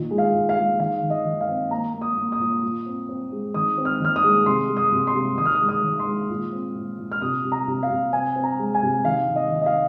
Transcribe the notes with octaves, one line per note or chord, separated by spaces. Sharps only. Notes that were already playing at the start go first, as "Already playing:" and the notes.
Already playing: A#2 D#3
G#3
F5
A#2
F5
G#3
D#3 F5
D#3
D#5
D#3
F5
C4
A#3 A#5
A#3
D#6
A#3
D#6
A#2
A#2
C4
C4
G#3
D#3 D#6
C4
F6
D#3 F6
D#6
G#3
C3 C6
G#3
D#6
C3
C6
C3
D#3 D#6
F6
D#6
G#3
D#6
D#3
C6
G#3
A#2
C4
A#2
A#2
F6
C3 D#6
C3
A#5
C3
F5
C3
C4 G#5
C4
A#5
G#3
G#5
C3
D#3 F5
D#3
D#5
D#3
D#5
F5